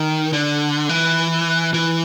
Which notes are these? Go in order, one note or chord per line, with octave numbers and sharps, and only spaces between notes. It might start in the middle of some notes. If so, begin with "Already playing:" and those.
Already playing: D#3
D3
E3
E3